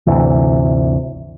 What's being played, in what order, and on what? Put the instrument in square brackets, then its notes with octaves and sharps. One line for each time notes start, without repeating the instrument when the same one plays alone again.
[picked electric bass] G1 D2 C3 E3